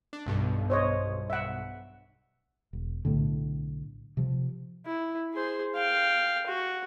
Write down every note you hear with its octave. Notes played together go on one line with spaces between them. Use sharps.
D4
B1 G2 B2
C5 C#5 D#5
E5 F#5
E1
B1 A2 D3
C3 F3
E4
G#4 C5
F5 G5
F#4